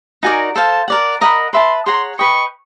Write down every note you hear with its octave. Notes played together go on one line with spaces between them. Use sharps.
D#4 F#4 A#4 D5 G#5
A4 C5 F5 A5
A#4 D5 F#5
A#4 D#5 F#5 A#5 B5
B4 E5 A5 C6
G#4 C#5 F#5 A#5 C6
B4 D#5 G5 C#6